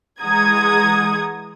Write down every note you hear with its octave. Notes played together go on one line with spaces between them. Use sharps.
E3 G#3 F#5 A#5 D#6 G#6